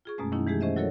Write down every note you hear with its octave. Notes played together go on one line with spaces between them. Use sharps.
F4 G#4 C#6
F#2 B2 G#3 A3 C#4
D#3 F#3 A#3 C#4 D#4 E4
E3 G#3 A3 G4 G#4
C#4 G#4 C5 D#5 E5
F#3 E4 F#4 A4 A#4 C#5